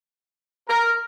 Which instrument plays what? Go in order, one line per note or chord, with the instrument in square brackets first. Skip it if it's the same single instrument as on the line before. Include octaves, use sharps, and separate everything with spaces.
[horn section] A#4